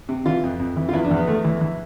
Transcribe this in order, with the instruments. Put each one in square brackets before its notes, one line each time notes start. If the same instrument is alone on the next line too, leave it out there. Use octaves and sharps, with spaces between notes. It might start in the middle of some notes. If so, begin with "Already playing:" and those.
[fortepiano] C3
E3 F4
F2
F2
E3
F4
E2 E4
D4
E2
B3
E2 A3
E3
E3